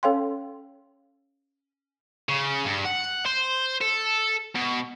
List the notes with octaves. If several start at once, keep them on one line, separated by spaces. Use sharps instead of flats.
C#4 A4 C#5 F5 G5 C6
C#3
G2
F#5
C5
A4
B2